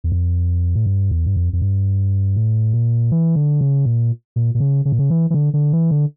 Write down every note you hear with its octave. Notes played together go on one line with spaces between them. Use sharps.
E2
F2
A2
G2
E2
G2
F2
F2
G2
A2
A#2
E3
D3
C#3
A#2
A#2
A#2
C#3
C#3
A#2
C#3
E3
E3
D3
D3
E3
D3